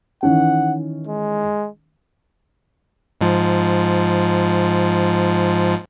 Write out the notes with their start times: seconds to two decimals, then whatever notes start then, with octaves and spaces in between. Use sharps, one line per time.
0.23 D#3 E3 C#4 F#5
1.07 G#3
3.21 G#2 F3